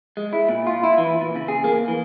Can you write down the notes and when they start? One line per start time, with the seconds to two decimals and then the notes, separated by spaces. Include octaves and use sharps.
0.17 G#3
0.33 E4
0.48 A#2
0.67 F4
0.84 E4
0.98 E3
1.21 A#2
1.36 C#3
1.48 G#4
1.64 A#3
1.88 E3